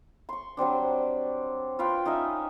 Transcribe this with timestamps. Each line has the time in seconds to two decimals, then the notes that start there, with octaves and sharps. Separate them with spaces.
0.29 C6 C#6
0.57 F#3 G3 C4 D4
1.79 F4 B4 F5 G5
2.05 C#4 D#4 D#5 E5